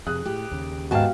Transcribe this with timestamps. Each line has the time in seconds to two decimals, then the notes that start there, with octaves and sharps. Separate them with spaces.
0.07 F2 C3 G#4 D#6 F#6
0.26 A2 G4
0.52 D#2 C#3
0.91 G#2 B3 F#4 G4 F5 G5 A5